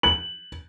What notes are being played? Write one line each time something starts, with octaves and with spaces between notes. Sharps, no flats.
F#7